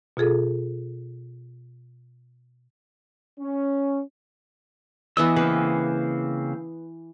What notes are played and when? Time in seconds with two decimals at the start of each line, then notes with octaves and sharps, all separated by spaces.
0.17 B2 F4 G#4 A4
3.39 C#4
5.17 E3 B3 D#5 E6
5.36 C#3 A#3 C4 B4